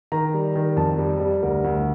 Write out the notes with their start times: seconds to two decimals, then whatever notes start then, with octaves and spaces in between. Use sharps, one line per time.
0.12 D#3 A#5
0.34 G3
0.56 D#3
0.77 F2 A5
0.98 G3
1.20 G3
1.42 D2 A#4
1.64 D2